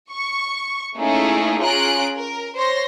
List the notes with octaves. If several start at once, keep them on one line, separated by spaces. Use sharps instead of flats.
C#6
A3 A#3 C#4 D#4 E4 G#4
C#4 F4 G#4 A#5 F#6 D7
A#4
C5 C#5 C6 A#6